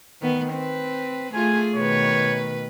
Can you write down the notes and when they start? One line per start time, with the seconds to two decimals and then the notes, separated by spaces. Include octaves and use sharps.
0.22 D#3 B3
0.53 C4 B4
1.34 A3 F4 G#4 G#5
1.75 B2 D#3 B4 C#5